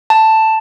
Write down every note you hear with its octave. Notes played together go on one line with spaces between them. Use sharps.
A5